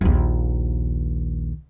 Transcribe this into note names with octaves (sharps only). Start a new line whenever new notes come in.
A#1 D#2